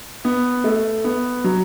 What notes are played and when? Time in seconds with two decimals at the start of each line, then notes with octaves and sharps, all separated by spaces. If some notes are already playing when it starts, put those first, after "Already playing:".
0.25 B3
0.64 A3
1.04 B3
1.44 F#3